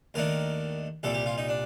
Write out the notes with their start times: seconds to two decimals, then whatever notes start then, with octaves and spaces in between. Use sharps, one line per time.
0.14 D#2 D#3 A3 D4 A#4
1.03 C2 A#2 G3 A4
1.14 G4
1.26 F4
1.38 D#4
1.49 D4